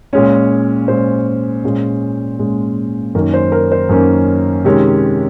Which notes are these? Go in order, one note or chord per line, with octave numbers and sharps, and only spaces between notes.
A#2 G#3 C#4 C#5
A#2 G#3 C#4 C5
A#2 G#3 C#4
A#2 G#3 C#4
F#2 D#3 A#3 C#4 A#4
C5
A#4
C5
F#2 D#3 A#3 C#4
C3 D#3 G#3 C#4 C#5